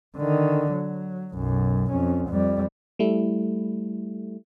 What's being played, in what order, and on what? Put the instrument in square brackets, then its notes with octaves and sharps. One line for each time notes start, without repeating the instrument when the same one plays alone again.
[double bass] D3 D#3
F#3
B1 F#2
F2 C#4
F2 G3
[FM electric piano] G3 A3 E4